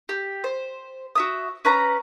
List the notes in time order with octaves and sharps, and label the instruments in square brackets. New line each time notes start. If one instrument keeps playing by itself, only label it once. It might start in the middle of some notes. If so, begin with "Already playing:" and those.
[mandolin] G4
C5
F#4 E5 D#6
C#4 B4 A#5